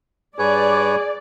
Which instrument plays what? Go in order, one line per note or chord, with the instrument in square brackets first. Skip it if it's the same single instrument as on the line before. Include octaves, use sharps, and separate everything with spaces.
[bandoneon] G2 B4 C#5 [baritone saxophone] G#4 [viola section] D5